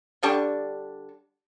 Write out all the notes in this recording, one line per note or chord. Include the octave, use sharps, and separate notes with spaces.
D3 G3 D4 C#6